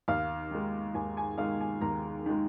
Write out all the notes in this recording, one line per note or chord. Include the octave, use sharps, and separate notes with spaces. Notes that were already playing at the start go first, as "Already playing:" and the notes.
D#2 F5
D#3 G#3
D#2 G#5
G#5
D#3 G#3 F5
G#5
D#2 A#5
D#3 G#3